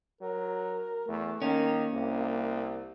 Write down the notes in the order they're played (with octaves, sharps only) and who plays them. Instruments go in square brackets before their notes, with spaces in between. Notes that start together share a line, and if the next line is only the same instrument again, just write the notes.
[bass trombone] F#3 [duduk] A#4
[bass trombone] E2 [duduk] A3
[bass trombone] D#3 [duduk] A#3 [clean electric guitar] C#4
[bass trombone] C2